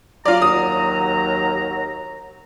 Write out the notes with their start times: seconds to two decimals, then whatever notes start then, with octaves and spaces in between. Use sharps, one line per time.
0.25 F#3 F4 D5 A#5
0.42 D#2 D#6